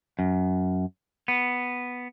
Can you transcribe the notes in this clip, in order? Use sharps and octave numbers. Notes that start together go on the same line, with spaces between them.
F#2
B3